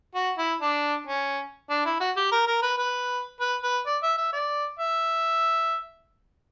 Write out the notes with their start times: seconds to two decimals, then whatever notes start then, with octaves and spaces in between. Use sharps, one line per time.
0.15 F#4
0.38 E4
0.61 D4
1.07 C#4
1.70 D4
1.85 E4
2.00 F#4
2.17 G4
2.31 A#4
2.47 A#4
2.62 B4
2.78 B4
3.40 B4
3.63 B4
3.86 D5
4.03 E5
4.17 E5
4.32 D5
4.79 E5